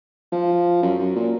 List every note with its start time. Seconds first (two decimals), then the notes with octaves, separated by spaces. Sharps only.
0.32 F3
0.82 F#2
0.99 F#2
1.15 A#2